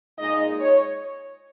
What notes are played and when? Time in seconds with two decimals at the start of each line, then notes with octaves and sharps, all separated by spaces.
0.18 A#2 G#3 D#4 D#5
0.59 C#5